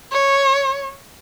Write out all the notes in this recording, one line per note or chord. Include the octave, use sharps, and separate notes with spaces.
C#5